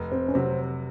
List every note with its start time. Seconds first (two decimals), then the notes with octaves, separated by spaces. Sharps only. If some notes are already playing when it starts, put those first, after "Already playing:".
Already playing: F1
0.12 C4
0.28 C#4
0.34 C3 F#3 C4